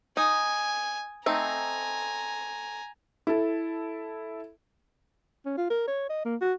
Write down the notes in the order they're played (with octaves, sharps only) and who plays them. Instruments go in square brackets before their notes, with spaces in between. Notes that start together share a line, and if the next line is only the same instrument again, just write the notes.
[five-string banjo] D#4 [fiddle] G#5 [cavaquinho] D#6
[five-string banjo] A3 C4 D#4 [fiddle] G#5 A#5
[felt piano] E4 A4
[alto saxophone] C#4
F4
A#4
C#5
D#5
A#3
F#4